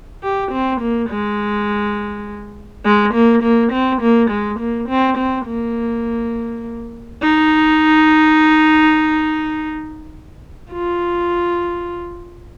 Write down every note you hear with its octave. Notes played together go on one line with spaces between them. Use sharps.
G4
C4
A#3
G#3
G#3
A#3
A#3
C4
A#3
G#3
A#3
C4
C4
A#3
D#4
F4